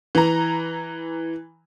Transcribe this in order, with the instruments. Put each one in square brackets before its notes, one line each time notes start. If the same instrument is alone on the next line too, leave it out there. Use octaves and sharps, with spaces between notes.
[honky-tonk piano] E3 A#5